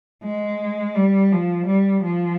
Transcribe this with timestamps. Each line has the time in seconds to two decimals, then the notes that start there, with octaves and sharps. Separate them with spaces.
0.23 G#3
0.95 G3
1.32 F3
1.67 G3
2.03 F3